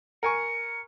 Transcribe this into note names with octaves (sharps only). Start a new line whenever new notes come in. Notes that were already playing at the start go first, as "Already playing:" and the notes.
A#4 G#5 C#6 C#7